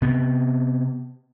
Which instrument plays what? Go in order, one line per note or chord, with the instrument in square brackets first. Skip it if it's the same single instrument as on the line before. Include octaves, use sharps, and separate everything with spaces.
[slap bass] C3 B3